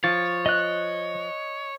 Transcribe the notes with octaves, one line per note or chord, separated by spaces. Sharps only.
F3 C#5 A6
D#5 F#6